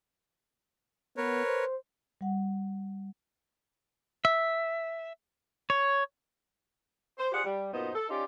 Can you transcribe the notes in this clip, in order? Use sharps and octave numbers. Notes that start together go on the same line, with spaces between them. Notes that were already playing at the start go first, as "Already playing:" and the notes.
B3 A#4 B4 C#5
C5
G3 F#5
E5
C#5
C5
F4 G4 G#4 C5 D5 F#5
G3
F#2 A#2 B3 D#4 C5
A4
C#4 D#4 F4 G4 D5